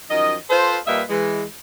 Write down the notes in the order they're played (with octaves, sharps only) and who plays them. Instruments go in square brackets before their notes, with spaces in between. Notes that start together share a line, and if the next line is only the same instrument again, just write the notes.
[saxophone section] F#2 D#3 F3 D#5
F4 A4 B4 C5
A#2 G3 A#3 B4 D#5 E5
E3 G#3